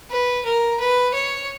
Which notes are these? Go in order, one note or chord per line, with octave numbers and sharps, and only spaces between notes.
B4
A#4
B4
C#5